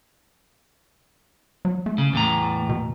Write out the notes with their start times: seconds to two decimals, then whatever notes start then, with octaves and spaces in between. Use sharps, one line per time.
1.65 F#3
1.86 A3
1.98 C#3
2.13 E2 A2 A#5
2.69 B2